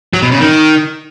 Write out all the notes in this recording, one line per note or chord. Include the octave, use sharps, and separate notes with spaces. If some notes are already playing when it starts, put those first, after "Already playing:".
F#3
B2
C#3
D#3